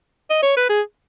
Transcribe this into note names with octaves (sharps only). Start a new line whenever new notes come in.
D#5
C#5
B4
G#4